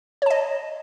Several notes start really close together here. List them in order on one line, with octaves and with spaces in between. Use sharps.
C#5 A5 D#5